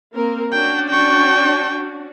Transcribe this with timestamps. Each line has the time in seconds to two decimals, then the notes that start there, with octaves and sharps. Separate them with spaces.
0.14 A#3 C4 A#4
0.52 C#4 D4 F#4 G5
0.90 G5 C#6